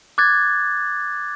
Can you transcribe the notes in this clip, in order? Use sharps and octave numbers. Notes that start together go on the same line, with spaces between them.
D6 F#6 G#6 A6